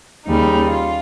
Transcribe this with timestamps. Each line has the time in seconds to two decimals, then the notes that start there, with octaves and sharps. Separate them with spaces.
0.26 D#2 C#3 G3 D#4
0.70 F4